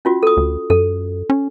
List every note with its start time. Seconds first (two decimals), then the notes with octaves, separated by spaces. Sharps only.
0.05 C#4 F4 F#4
0.23 A4 D#6
0.37 D2
0.70 F#2 A4
1.30 C#4